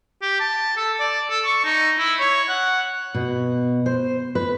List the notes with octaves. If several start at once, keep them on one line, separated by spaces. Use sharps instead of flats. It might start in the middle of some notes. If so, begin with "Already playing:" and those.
G4
A5
A4
D5
A4
C#6
D#4
E4
C#5
F#5
B2
C5
B4